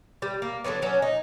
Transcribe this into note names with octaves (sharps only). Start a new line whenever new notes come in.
G3
A#3
D3 D#3 F#3 B3
F#3 C#4 D4
D#4